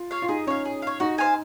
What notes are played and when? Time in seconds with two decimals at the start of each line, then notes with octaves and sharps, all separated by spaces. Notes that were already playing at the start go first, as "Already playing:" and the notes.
Already playing: F4
0.11 C#5 F5
0.22 F4
0.29 D#4 G#4
0.47 C#4 C#5 F5
0.65 G#4
0.82 C#5 F5
1.00 D#4 F#4
1.18 C5 F5 G#5